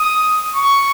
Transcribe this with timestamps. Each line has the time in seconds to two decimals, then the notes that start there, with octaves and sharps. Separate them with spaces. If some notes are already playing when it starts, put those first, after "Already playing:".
Already playing: D#6
0.55 C#6